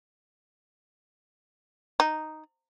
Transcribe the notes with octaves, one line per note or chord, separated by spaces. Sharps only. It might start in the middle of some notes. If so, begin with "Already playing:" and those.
D#4